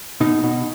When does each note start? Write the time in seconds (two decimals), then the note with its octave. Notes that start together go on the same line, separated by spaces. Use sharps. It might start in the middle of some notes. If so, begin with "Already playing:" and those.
0.20 B2 D#4
0.44 B2